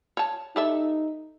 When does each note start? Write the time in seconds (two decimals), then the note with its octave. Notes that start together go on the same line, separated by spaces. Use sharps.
0.17 C#5 A5
0.56 D#4 G4 A4 E5